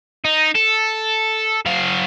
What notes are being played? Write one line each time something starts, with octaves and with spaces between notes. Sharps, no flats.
D#4
A4
F#3 F5